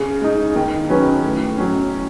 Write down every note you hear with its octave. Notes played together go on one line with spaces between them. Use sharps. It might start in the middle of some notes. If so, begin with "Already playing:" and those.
Already playing: C#3
G#3 D#4
D#3
F#3 C#4 G#4 B4
A2
F#3 C#4